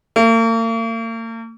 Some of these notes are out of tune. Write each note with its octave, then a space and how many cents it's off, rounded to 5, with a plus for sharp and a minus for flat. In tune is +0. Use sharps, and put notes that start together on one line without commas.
A#3 -45